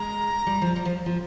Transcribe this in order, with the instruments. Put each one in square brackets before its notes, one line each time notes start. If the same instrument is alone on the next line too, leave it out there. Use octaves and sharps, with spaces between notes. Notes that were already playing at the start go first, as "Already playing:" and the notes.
Already playing: [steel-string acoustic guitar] G#3 [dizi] A#5
[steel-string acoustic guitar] G3
F3
G3
F3
F3